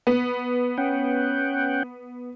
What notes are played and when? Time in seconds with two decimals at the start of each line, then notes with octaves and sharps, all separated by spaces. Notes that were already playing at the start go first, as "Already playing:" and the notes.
0.07 B3
0.78 C#4 F#5 G5